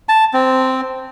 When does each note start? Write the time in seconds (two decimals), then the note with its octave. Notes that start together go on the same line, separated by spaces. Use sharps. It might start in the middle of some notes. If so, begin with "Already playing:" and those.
0.09 A5
0.33 C4